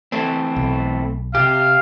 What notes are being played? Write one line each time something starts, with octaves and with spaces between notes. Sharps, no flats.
E3 A3 C4
B1
C3 G4 F5